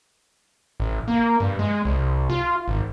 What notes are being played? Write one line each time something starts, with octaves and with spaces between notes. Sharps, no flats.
A1
A#3
G2
G#3
C2
F4
G#1